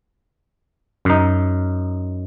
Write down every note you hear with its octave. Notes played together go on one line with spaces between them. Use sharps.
F#2 D#4